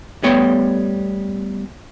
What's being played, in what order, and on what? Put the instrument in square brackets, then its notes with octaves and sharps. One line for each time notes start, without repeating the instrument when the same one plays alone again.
[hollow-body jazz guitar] G3 A3 B3 C#5 G5